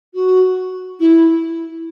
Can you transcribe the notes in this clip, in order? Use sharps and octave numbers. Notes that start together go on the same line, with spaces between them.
F#4
E4